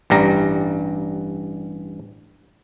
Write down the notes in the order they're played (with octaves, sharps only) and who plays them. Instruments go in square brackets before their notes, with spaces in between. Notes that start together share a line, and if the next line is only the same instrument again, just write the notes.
[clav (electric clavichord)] A1 G2 G3 A#5